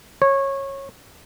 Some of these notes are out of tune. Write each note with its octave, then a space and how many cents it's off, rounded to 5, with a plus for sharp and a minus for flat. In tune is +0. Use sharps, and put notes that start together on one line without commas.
C#5 -20